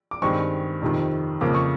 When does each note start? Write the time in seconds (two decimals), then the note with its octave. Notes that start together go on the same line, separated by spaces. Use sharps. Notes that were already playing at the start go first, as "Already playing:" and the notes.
0.11 D6
0.22 G2 D#3 G#3 C4 C#6
0.82 F2 C3 D#3
1.41 F2 C#3 F3 A#3 D6
1.55 C#6